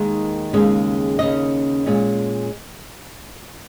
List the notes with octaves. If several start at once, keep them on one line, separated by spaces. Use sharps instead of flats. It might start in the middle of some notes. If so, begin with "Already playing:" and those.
Already playing: D#2 D#3 G#3 D#4
D#2 C#3 G#3 C#4
D#2 C#3 G#3 C#4 D#5
A#2 G#3 C#4